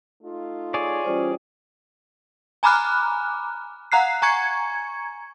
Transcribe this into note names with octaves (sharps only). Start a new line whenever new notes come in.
A3 D#4 F4
G#4 C#5 D5
E3 G3 C#4 F4 C5
G#5 A#5 B5 D6 F6 F#6
F5 F#5 A#5 F#6 C7
G#5 A#5 C#6 G#6 C#7